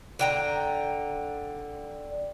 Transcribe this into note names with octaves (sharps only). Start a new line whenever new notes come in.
D3 G5 A#5